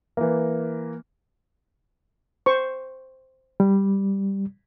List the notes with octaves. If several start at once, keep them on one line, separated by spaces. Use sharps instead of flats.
E3 A#3
C5 C#6
G3